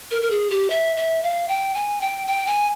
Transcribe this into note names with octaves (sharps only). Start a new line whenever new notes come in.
A#4
A#4
G#4
G4
E5
E5
F5
G5
G#5
G5
G5
G#5